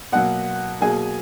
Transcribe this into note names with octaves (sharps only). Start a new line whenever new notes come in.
B2 F#3 A#3 F#5
B2 F#3 A#3 G#4 G#5